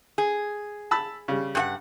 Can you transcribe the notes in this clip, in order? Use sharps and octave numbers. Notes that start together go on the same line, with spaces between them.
G#4
A5 B5 E6
C#3 G3
G2 G#4 F#5